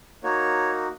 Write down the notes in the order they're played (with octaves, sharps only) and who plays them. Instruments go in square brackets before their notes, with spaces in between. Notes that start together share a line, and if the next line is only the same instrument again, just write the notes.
[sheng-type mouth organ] A#3 D#4 F#4 C#5